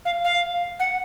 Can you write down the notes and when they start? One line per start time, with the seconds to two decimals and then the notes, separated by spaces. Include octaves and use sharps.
0.05 F5
0.24 F5
0.80 F#5